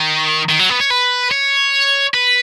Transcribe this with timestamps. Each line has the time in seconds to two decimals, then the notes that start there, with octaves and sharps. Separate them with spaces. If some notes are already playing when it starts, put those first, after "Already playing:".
Already playing: D#3
0.49 D#3
0.59 F#3
0.70 B3
0.80 C#5
0.90 B4
1.31 C#5
2.14 B4